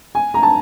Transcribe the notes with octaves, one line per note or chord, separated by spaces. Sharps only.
G#5
A#5
A5